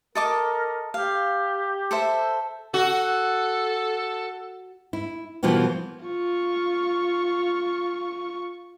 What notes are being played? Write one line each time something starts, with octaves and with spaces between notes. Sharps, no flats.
A4 A#4 D#5 D6
G4 F5
A4 C5 E5
F#4 A4
E4
B2 E3 F3 G3 A#3 C4
F4 C#6